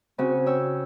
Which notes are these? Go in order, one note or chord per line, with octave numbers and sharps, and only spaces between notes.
C#3 C4 C#4 F#4
C#5 G5 E6